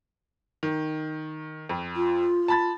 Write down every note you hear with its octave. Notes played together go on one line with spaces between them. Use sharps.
D#3
F2
F4
A5 B5 A6